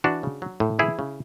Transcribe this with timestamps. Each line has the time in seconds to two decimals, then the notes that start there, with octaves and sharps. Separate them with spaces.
0.04 E3 D4 F#4
0.23 C#3
0.42 F#3
0.60 A2
0.79 E3 E4 G#4
0.99 C#3